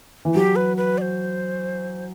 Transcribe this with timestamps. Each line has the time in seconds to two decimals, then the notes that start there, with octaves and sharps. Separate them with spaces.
0.25 E3
0.35 F#3 G4
0.56 B4
0.77 B4
0.98 D5
1.02 C5